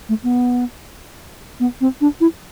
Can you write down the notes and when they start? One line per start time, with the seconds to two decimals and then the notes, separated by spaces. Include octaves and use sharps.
0.09 A3
0.23 B3
1.60 B3
1.81 C4
2.01 D4
2.21 E4